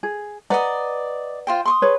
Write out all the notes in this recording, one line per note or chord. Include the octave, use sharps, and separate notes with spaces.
G#4
B4 D5 D#5 F#5 A#5
F4 C5 G5
C6 C#6 D#6
G#4 B4 C#5